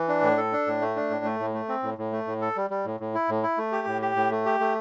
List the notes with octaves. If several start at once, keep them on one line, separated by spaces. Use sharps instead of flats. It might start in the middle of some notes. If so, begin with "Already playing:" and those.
Already playing: E3
D4
A2
A4
D4
A2
A3
D4
A2
A3
A2
A3
C4
A2
A2
A3
A2
A4
G3
G3
A2
A2
E4
A2
E4
A3
G4
A2
G4
A2
A3
G4
A3